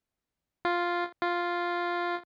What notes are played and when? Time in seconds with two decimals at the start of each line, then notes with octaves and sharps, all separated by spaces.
0.65 F4
1.22 F4